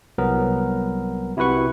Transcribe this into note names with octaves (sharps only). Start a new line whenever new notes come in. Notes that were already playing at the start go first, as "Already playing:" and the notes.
C2 F#3 B3 A#4
C3 E4 F#4 B4 C#6